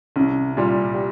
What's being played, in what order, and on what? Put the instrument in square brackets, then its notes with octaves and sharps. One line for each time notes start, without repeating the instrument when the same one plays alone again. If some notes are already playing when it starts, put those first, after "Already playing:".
[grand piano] C2 [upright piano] C#4
[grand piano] A#2 G3 [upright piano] F4
[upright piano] G4